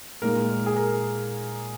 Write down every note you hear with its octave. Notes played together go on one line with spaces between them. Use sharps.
A#2 G#3 D#4 A#4
G#4
A#4